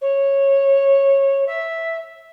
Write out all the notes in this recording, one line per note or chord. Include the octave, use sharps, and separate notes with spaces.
C#5
E5